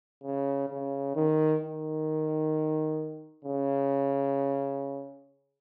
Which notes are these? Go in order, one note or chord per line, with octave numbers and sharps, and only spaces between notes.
C#3
C#3
D#3
D#3
C#3